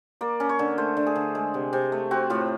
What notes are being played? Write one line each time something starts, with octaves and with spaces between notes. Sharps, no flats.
A#3 D5
C#4
C#5
D3
A3 C5
D3
G#4
D3
G#3
C3
C3
A3
C4 F#4
A2 F4